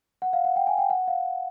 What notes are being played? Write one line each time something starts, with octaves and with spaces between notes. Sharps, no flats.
F#5
F5
F#5
G5
G#5
G5
F#5
F5